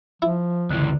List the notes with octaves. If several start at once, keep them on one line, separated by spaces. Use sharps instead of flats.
F3 E4
C#2 D3 E3